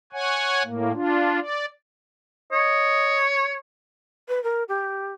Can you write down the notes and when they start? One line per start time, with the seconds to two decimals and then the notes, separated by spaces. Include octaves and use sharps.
0.13 C#5 F#5 G#5
0.64 A2 A#3
0.94 D4 F4
1.40 D5
2.52 C#5 D#5
4.28 B4
4.43 A#4
4.68 G4